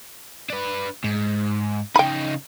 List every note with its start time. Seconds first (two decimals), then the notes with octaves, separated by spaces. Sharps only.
0.50 D4 B4
1.04 G#2
1.96 C#3 D#4 G5 B5